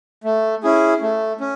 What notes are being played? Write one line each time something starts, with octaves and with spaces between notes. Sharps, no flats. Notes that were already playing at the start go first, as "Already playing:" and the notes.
A3
C#4 E4 G#4
A3
C#4